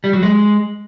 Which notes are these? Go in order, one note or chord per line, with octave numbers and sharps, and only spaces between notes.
G3
F#3
G#3